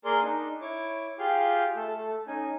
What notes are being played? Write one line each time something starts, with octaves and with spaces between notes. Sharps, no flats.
A#3 G#4 A#4 D5 C6
D4 D#4
E4 C#5 D6
F4 G4 G#4 F5 G5
A3 A4
C#4 D#4 G#5